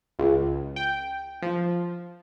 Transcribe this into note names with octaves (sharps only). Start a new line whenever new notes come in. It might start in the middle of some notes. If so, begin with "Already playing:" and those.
C#2
G5
F3